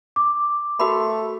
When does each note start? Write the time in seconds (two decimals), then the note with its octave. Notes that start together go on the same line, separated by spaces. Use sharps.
0.16 D6
0.80 A3 F#4 A#4 B5